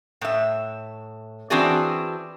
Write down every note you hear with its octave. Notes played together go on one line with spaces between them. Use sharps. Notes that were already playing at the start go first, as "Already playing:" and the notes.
A2 E5
E3 C4 D4 F#4 G#4 D5